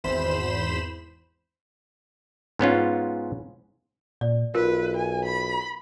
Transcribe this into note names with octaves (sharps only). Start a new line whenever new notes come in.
G#1 E2 C5 B5 E7
G#2 B3 C#4 F4
A#2 D5
B1 F4 A#4 B4
G#5
B5